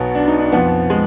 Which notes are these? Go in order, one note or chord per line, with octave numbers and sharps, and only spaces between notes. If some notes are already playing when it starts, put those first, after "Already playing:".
Already playing: B1 B2 F#3 B3
D4
D#4
D4
F2 F3 B3
G#3